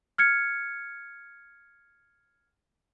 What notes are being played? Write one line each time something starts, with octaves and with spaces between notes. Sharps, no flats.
F6 G#6 C#7